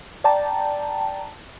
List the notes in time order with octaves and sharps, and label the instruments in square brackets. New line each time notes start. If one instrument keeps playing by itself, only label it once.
[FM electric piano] D5 G5 A5 A#5